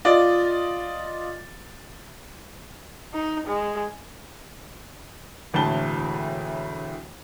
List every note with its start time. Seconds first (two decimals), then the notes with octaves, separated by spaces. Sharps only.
0.05 F4 D5 D#5
3.14 D#4
3.47 G#3
5.54 E1 D2 A2 A5 G7